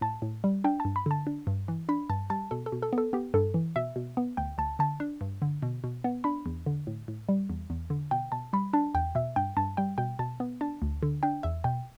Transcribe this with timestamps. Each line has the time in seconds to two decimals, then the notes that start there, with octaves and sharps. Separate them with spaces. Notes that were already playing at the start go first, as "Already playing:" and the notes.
0.01 A2 A5
0.22 A2
0.44 G3
0.64 D4 G5
0.80 A5
0.85 G2
0.96 B5
1.06 D3 A5
1.27 D4
1.47 G2
1.68 E3
1.89 D4 B5
2.10 G2 A5
2.30 G3 A5
2.51 B2 A4
2.66 A4
2.72 B2
2.82 A4
2.93 B3
2.98 A4
3.13 B3 G4
3.34 G2 A4
3.54 E3
3.76 B2 E5
3.96 B2
4.17 B3
4.37 D2 G5
4.58 D2 A5
4.79 D3 A5
5.00 D4
5.21 G2
5.42 D3
5.62 B2
5.84 B2
6.04 B3
6.24 D4 B5
6.46 E2
6.66 D3
6.87 A2
7.08 A2
7.29 G3
7.50 E2
7.70 E2
7.90 D3
8.11 B2 G5
8.32 B2 A5
8.53 G3 B5
8.73 D4 A5
8.94 E2 G5
9.15 B2 E5
9.36 G2 G5
9.57 G2 A5
9.77 G3 G5
9.98 B2 G5
10.19 B2 A5
10.40 B3
10.61 D4 A5
10.82 D2
11.03 D3
11.23 D4 G5
11.43 E2 E5
11.64 B2 G5